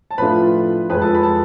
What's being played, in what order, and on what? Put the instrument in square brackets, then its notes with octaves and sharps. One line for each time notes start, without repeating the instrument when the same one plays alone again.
[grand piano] A5
[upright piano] A2 F3 A3 D4 F4 [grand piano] B4 B5
[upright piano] F2 F3 G#3 [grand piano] B4 B5
[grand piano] A4 A5
B5
A5